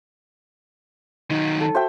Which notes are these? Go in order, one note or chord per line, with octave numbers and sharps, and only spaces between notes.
D#3 F#3 D#4
A4
F#4 C5 E5 G5